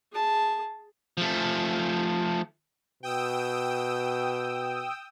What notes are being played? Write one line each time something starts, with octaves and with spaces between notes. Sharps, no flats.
G#4 A5
F3 A3
B2 G5 D#6 E6